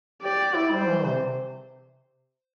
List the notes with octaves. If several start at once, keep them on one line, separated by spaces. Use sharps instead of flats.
G4 D5
G4
E4
G3 C5
E3
C3